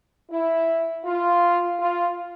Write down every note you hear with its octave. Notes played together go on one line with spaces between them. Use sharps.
E4
F4
F4